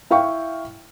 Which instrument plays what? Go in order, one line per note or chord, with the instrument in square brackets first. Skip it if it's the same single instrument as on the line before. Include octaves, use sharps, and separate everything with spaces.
[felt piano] E4 F5 G5 C#6